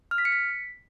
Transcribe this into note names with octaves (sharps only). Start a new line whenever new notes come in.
F6
B6
C#7
B6